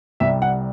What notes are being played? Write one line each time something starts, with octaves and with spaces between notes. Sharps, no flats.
C2 C3 G3 E5
F#5